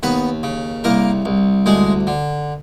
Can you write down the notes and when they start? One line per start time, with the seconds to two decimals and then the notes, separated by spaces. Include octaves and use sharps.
0.03 D#2 B3 B4
0.43 C#3
0.84 C2 A#3 A#4
1.25 C2
1.66 D2 G#3 G#4
2.07 D3